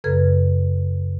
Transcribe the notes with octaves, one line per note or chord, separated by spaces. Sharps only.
F#2 C#3 A4 B4 G#6